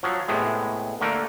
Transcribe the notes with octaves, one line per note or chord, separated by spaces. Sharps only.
F3 F#3
A2 C3 G#3 B3
D3 A3 A#3 A#4